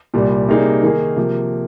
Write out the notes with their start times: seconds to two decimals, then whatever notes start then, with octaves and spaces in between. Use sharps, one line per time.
0.14 C2 A#2 G3
0.48 C3 G3 A#3 D#4 G#4
0.83 D#3 A#3 D#4 G#4
1.16 C3 F3 A#3